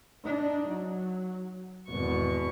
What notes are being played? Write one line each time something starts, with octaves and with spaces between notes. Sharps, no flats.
D4 D#4
F#3
G#1 E2 B2 C#6